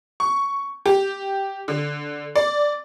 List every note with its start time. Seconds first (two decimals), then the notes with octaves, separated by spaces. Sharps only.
0.20 C#6
0.86 G4
1.68 D3
2.35 D5